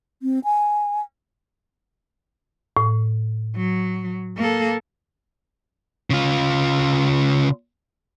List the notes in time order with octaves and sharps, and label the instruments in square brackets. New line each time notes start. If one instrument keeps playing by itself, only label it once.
[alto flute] C4
G#5
[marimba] A2
[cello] F#3
A#3 A4
[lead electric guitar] C#3 F4